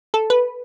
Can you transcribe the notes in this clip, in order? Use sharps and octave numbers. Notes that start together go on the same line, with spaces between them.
A4
B4